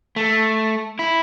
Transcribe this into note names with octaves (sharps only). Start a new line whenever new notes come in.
A3
E4